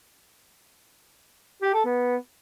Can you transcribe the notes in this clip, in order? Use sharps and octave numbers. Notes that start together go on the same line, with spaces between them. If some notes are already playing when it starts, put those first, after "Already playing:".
G4
A4
B3